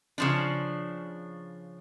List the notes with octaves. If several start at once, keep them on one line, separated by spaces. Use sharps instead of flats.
C#3 F3 D4